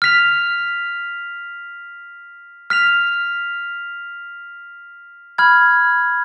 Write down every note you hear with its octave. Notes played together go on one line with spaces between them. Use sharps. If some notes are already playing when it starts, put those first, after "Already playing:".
F6 B6 F7
F6 B6 F7
B5 F6 G#6